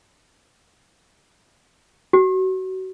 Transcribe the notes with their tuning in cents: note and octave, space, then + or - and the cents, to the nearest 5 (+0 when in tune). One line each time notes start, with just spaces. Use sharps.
F#4 +25